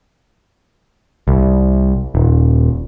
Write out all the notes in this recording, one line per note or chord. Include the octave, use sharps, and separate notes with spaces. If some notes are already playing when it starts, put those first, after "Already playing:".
C2
D#1